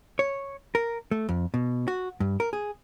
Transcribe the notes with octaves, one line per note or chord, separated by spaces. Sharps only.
C#5
A#4
A3
F2
B2
F#4
G2
A#4
G#4